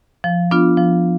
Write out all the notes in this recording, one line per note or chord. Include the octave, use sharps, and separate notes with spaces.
F3
B3 D4 F4
F3